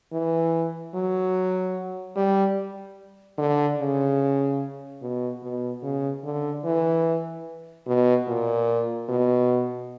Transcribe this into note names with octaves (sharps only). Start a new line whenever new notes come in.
E3
F#3
G3
D3
C#3
B2
B2
C#3
D3
E3
B2
A#2
B2